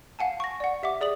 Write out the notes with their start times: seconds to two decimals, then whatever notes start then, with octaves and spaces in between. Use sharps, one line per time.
0.19 F5 F#5 G#5 A5
0.40 C#6 A#6
0.60 D5 F#5
0.83 G4 E5 F#5 D6
1.01 G#4 D5 D#6 F#7